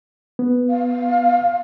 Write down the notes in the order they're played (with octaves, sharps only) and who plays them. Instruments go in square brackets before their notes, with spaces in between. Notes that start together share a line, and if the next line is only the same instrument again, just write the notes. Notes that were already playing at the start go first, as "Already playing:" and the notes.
[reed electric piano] B3
[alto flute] F5